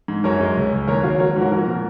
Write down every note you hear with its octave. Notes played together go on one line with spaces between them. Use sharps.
G#2
F#2 A#4 C#5
G#3
C#2
C#2
D#2 A#4 C#5
F#3 C#5 F5
F#3 A#4 C#5
G#2 F#4 A#4
F3 F#4 A#4
A#2